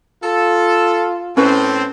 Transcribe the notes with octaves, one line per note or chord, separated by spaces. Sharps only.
F4 A4
A2 C4 C#4 B4